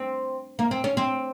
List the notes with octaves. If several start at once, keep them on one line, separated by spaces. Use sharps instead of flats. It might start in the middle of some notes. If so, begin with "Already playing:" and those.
Already playing: C4
A#3
C4
C#4
C4